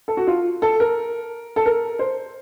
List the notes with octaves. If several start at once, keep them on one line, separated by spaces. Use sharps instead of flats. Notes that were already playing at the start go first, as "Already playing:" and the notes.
A4
F#4
F4
A4
A#4
A4
A#4
C5